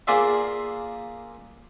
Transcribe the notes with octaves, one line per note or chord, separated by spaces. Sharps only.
A#3 F4 G#4 C5 D5 E5